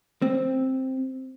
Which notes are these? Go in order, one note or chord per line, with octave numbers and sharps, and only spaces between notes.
C4